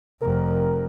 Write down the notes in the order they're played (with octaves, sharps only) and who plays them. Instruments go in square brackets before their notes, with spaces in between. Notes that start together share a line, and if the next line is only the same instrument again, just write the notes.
[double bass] F1 F2 [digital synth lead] A#4